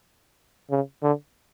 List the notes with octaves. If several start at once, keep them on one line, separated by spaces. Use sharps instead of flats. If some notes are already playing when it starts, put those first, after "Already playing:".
C#3
D3